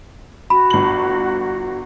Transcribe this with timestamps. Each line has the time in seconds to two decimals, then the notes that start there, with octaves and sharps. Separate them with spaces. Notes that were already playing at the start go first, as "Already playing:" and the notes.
0.50 F#4 B5
0.70 G1 F#7